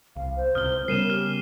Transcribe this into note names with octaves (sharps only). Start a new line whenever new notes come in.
C2 F5
C5
C#2 C3 D#6 F6 G7
C#3 G3 B3 C#4 A#4 C7 D#7 E7
G4 F6